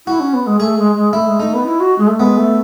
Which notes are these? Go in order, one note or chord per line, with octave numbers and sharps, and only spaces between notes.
E4 F#4
C#4
B3
G#3
A3 G#4
G#3
G#3
A3 E4
G#3
A3 D#4
B3
E4
F#4
G#3
A3
G#3 B3
A3